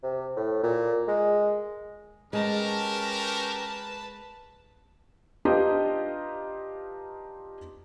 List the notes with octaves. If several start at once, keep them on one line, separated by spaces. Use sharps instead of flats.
C3
A2
A#2
G#3
G#3 C#4 G4 A#4 B4 A5
D4 D#4 F4 G4 B4 D#5